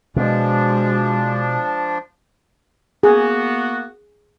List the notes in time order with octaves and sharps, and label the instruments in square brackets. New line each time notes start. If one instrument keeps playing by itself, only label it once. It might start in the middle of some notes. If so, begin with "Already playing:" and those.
[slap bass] B2 [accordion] F3 D4 [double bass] G#3
[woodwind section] A#3 B3 F#4 [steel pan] G#4